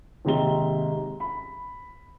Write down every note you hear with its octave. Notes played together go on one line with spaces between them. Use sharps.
D#2 G#2 C3 D#4 A#5 G7
B5